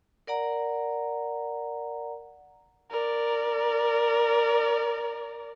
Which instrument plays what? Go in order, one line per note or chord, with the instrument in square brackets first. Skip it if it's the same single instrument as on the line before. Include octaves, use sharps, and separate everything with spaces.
[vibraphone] A#4 D5 F#5 A#5
[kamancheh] A#4 D5